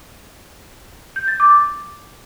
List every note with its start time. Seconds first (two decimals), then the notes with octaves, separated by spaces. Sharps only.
1.16 G6
1.28 A6
1.40 D6